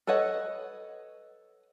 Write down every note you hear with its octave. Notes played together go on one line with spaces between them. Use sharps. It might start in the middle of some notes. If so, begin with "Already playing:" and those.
A4 B4 C#5 D#5 F#5